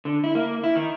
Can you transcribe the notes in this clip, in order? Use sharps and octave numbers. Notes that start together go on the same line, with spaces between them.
D3
E4
A#3
E4
D#3